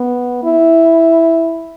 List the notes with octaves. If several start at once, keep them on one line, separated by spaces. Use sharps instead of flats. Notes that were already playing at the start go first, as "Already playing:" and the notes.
Already playing: B3
E4